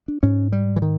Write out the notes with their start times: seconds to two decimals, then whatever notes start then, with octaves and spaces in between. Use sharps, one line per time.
0.08 D4
0.23 G#2 C#4
0.52 G3
0.76 E3
0.82 D#3